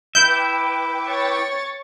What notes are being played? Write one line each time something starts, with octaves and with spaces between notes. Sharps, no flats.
E4 B4 E5 G5 D6 G6
C#5 C#6 A6